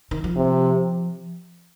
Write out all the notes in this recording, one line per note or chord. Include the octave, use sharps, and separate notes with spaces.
D#3
F3
C3